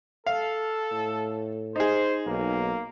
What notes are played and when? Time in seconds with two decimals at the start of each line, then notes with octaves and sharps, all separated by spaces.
0.27 A4 F5
0.92 A2
1.76 D#4 G#4 C5
2.27 B1 A#3